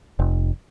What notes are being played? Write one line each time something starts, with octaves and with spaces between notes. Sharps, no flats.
F1